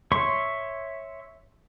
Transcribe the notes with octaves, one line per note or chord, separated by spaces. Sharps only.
C#5 E5 C6 C#6